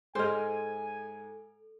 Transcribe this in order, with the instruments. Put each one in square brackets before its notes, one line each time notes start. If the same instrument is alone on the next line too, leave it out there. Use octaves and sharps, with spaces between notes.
[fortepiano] G#2 G#3 F6 [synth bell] A4 [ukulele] C5 D#5 [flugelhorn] G#5